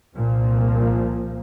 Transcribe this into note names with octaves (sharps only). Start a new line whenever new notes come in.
C2 A#2 F3 A#3